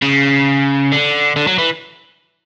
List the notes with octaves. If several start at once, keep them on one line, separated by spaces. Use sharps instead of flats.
C#3
D3
D3
F#3
E3